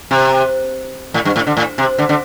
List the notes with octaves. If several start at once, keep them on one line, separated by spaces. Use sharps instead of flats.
C3
A2
G2
A2
D3
A2
C3
D3
D3